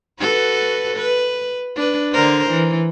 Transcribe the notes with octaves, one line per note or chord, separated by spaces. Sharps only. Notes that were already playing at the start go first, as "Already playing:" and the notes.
F#4 A4 B4
B4
D4 B4
D3 A#4 C5
E3